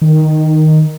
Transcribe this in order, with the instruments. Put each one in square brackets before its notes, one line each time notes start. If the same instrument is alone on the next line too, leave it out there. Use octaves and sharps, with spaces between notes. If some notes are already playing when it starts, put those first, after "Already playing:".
[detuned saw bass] D#3